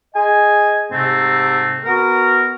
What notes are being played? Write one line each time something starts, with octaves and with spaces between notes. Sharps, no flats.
G#4 D#5 G#5
G#2 C3 A3 C4
B3 F#4 A#4